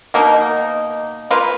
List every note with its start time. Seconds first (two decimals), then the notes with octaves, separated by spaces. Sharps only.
0.14 B2 A#3 D#4
1.31 A#3 F4 B4